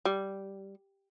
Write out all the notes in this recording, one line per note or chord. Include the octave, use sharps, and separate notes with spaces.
G3